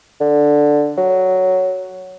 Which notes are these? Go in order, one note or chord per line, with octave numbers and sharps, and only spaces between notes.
D3
F#3